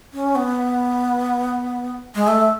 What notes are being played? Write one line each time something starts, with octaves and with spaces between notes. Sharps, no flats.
C#4
B3
G#3
A3